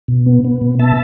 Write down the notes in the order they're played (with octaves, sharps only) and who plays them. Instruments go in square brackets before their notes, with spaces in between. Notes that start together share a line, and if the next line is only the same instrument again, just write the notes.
[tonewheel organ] B2
B3
B3
B2
B3 E5 A5